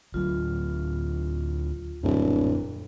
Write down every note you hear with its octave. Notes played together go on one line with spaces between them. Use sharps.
D2 F#3 F4
D1 F#2 A#2 A3